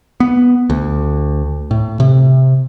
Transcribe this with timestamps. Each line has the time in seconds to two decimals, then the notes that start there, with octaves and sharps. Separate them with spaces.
0.20 B3
0.70 D2
1.71 A2
2.00 C3